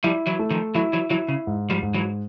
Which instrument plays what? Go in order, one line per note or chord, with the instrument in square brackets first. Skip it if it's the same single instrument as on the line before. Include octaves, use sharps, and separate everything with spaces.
[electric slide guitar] F3 G3 [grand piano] E4
[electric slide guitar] E3 F#3
[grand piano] A3
[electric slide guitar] D#3 F3
[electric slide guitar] E3 F#3 [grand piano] E4
[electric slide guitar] E3 F#3
[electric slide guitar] E3 F#3 [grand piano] E4
[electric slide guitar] C#3
[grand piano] G#2
[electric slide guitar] F3 G3
[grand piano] G#2
[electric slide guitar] E3 F#3